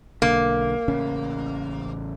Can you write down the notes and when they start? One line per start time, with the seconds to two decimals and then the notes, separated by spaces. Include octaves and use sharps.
0.22 B1 D3 A#3
0.88 A1 C#3 C#4